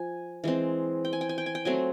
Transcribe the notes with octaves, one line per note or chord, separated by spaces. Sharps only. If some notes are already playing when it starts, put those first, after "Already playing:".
Already playing: F3 G#5
E3 G#3 C4
G5
G#5
G5
G#5
G5
G#5
G5
F#3 A3 C4 G#5